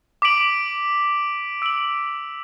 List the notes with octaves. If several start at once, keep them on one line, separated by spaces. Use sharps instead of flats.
D6 B6 D7 F#7
E6 D7 F#7